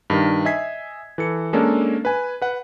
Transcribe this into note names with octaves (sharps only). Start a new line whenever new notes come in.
G2 D#3
D#5 E5 G#5 G#6 B6 C7
E3 A4 C#7
G#3 A#3 C#4 D4 A4
B4 G#5
B4 F#5